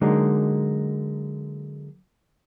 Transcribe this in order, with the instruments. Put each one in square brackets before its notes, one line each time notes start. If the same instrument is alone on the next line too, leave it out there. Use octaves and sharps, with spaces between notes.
[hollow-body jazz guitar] D3 F#3 G#3 A#3 D#4